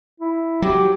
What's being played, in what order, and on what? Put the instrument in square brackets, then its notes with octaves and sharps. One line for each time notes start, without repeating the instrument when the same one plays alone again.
[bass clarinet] E4
[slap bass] F#3 [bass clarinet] G4